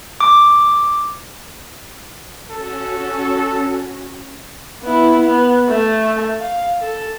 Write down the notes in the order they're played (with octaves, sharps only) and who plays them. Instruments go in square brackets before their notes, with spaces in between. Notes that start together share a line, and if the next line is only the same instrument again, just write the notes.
[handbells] D6
[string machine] C#4 F#4 [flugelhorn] A4
[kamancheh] B3 E4
B3
A3
F5
A4